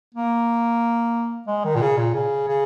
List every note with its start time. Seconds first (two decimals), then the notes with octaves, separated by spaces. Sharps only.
0.15 A#3
1.47 G#3
1.65 D#3
1.76 A#2
1.81 C#3
1.97 A#2
2.14 C#3
2.48 C#3